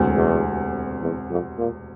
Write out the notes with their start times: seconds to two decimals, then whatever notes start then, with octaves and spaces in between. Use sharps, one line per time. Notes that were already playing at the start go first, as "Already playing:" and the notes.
Already playing: E1 D2 C3
0.16 E2
1.02 E2
1.30 F2
1.58 A#2